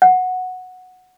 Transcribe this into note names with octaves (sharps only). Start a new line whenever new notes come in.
F#5